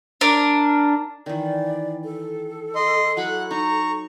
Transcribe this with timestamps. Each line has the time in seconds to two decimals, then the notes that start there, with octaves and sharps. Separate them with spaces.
0.21 D4 A#4
1.26 D#3 E3 D5
2.04 A4
2.75 D#5 C6
3.17 F#3 E4 F#5 B5 F#6
3.51 D#4 A#5 C#6